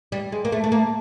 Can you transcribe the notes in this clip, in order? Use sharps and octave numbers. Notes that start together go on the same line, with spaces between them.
G3
G#3
A#3
A3
A3
A#3